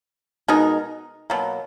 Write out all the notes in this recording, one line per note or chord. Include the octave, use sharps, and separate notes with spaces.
B2 G#3 D#4 A#4
B2 F#3 A#3